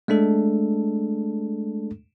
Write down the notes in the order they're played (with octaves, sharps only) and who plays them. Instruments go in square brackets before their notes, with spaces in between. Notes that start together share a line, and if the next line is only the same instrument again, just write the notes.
[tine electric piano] G#3 A3 D4 A4